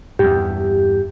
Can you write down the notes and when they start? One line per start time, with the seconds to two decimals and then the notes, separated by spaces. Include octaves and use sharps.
0.19 E2 G2 G4